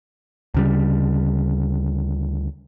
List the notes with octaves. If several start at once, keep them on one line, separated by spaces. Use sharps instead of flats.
D2 C#3 G3